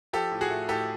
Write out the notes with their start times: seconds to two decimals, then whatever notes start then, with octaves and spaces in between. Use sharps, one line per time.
0.13 F3 G4 A4
0.32 A2
0.41 F#4 G#4
0.50 A3
0.68 A2 G4 A4